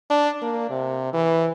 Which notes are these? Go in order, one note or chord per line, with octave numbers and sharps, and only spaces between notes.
D4
A#3
C3
E3